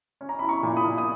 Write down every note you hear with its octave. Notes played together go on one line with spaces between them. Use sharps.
C#4
A#5
E4 B5
A#5 C#6
A#2
B5 D#6
A#2
D#6